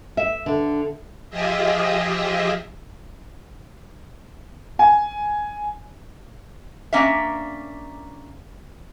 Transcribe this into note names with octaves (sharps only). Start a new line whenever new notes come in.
E5
D3
F3 F4 G4 G#4 D#5 E5
G#5
A#3 C#4 D4 E5